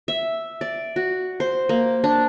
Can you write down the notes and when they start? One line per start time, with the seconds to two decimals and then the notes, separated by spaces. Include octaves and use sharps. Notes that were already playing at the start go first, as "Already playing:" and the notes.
0.08 E5
0.61 D5
0.96 F#4
1.40 C5
1.69 A#3
2.04 D4